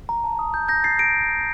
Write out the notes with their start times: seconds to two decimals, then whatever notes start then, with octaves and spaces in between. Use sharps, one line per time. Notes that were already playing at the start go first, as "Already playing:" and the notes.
0.09 A#5
0.24 A5
0.39 D#6
0.54 G6
0.68 G6 A#6
0.84 A6 C7
0.99 A#6 D7